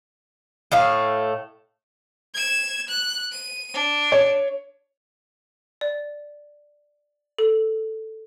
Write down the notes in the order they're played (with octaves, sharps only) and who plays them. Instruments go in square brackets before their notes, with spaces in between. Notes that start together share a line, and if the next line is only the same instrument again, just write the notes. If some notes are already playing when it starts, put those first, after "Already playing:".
[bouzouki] A2 A3 F5
[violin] G#6 E7
F#6
D#7
D4
[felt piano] C#5
[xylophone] D5
A4